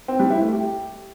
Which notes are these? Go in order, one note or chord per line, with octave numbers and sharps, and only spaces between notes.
C4
G3
E4
A3
G4